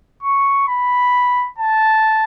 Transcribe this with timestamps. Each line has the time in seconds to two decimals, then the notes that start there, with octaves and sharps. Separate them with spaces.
0.23 C#6
0.68 B5
1.58 A5